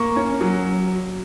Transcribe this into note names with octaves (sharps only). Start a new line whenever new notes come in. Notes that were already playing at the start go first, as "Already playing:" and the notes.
Already playing: A#3 C#6
C#4
F#3